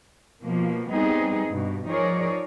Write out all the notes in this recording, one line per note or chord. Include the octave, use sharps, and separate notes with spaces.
B2 F3 A#3
G3 B3 C4 D#4 G#4
G2 B2
F3 D#4 G#4 A#4 C#5 D5